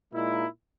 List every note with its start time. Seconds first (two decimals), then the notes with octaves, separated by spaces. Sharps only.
0.13 A#2 G#3 D#4 E4